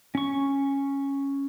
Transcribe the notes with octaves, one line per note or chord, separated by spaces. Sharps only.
C#4 C#6